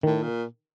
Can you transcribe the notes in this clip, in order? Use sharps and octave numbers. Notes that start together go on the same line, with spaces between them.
A2 D#3
A#2